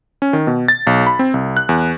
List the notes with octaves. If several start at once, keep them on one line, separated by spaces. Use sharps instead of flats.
C#4
D#3
B2
A6
B1
B5
C4
C2
F#6
E2